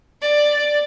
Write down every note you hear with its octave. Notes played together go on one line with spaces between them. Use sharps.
D5